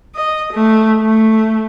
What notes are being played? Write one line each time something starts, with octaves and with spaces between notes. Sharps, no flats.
D#5
A3
A3